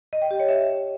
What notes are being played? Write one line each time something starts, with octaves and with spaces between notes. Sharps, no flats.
D#5
G5
G4
C#5
E5